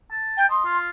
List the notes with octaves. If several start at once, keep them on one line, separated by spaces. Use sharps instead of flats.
A5
G5
D#5 C6
F4